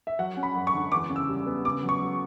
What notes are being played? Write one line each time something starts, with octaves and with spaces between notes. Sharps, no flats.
E5
F#3 F#5
C#4
B5
F#2
C#6
D3
E2 D6
C#3
E6
G3
B3
C#3 D6
F#3
C#6
F#3